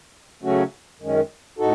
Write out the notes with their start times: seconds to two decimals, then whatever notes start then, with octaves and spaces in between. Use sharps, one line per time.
0.42 C#3 F#3 A3 C#4 F#4
1.00 F#2 D#3 G#3 C#4
1.58 A2 D#4 F#4 A4